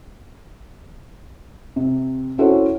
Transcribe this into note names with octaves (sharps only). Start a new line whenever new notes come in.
C3
C#4 E4 F#4 A4 C5 C#5